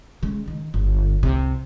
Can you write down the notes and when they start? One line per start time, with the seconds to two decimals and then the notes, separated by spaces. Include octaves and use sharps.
0.23 C#3 G#3
0.48 D#3
0.74 G1
1.23 C2 C3